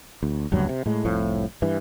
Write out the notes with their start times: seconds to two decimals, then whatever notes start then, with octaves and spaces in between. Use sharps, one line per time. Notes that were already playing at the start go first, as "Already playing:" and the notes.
0.23 D2
0.52 F#1 D2 G2 F#3
0.69 C3
0.86 A2 G#3
1.04 F1 C2 A2 F3
1.62 G2 E3